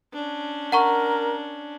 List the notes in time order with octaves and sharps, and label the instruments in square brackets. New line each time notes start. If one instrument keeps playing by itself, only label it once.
[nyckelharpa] C#4 D4
[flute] A#4 [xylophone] F#5 A#5 C#6